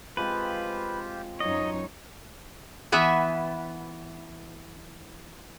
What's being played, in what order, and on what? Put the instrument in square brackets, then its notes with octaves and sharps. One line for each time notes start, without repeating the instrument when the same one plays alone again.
[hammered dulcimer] F3 G#3 C4 [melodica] F4 G4 C5 [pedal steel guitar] B4
[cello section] F#2 D#4 C#5 [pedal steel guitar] D#5
[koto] E3 B3 E5 G#5